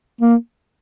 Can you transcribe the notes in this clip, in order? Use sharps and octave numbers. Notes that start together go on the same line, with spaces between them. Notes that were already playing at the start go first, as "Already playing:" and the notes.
A#3